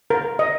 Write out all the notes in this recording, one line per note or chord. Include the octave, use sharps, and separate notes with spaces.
A#4
D#5